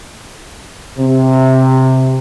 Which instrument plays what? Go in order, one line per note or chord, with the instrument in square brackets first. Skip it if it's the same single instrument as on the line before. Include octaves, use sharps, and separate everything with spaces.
[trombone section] C3